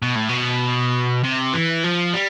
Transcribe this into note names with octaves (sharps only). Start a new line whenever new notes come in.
B2
A2
B2
C3
E3
F3
G3